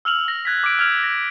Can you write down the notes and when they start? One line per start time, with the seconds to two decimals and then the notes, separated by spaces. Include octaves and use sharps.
0.05 E6 F6 F7 F#7
0.28 A#6
0.45 F#6 G#6 A#6 B6
0.64 D6 D7
0.79 F6 G#6 D7 F7
1.04 A#6